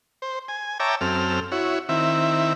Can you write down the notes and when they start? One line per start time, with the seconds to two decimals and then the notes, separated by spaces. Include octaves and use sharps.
0.22 C5
0.48 G#5
0.80 C#5 E5 G5 A5 A#5 D6
1.01 F#2 C4 A4 F6
1.52 E4 F#4 C#5
1.89 D#3 C4 E4 E5